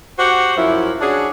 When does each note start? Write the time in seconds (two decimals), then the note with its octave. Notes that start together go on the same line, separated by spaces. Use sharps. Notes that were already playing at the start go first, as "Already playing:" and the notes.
0.19 F#4 G4 C5 F#5
0.57 F#2 F3 E4
1.01 C#4 D4 F#4 G#4